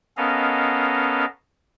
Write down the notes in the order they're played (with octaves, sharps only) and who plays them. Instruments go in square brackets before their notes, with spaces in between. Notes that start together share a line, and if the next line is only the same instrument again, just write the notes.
[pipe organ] B3 C#4 A4 A#4 D#5 F5